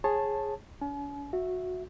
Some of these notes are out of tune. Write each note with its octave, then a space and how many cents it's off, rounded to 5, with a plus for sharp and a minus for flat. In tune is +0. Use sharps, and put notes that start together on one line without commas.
G#4 +0 C#5 -30 A5 +0
C#4 +45 G#5 +45
F#4 -15 E5 +0